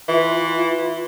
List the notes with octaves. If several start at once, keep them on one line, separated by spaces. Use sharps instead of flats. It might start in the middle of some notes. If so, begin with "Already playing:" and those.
E3 F4